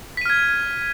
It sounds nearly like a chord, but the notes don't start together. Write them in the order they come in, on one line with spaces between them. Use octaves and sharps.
B6 D#7 F6 G#6